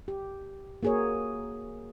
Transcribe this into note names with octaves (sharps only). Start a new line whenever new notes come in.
G4
A#3 F#4 G#4 A#4 C#5